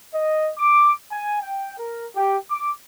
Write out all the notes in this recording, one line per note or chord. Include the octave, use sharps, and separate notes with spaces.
D#5
D6
G#5
G5
A#4
G4
D6